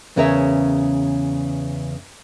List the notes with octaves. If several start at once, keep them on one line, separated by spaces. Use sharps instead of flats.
E2 C#3 C#4 A#4 C#5 E5